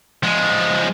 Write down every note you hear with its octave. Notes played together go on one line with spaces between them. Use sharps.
F3 G#3